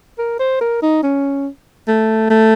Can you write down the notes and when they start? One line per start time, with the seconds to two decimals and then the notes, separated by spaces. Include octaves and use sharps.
0.18 A#4
0.39 C5
0.61 A#4
0.82 D#4
1.03 C#4
1.88 A3
2.30 A3